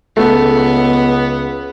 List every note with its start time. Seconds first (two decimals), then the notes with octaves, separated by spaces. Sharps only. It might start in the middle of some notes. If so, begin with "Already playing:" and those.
0.17 C#2 A3 B3